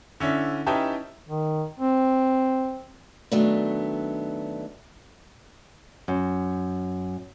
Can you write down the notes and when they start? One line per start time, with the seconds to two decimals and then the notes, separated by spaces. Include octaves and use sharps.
0.20 D3 C#4 E4
0.67 C#4 D#4 E4 G4 B4 A5
1.27 D#3
1.79 C4
3.32 D#3 F#3 A3 B3 D4
6.08 F#2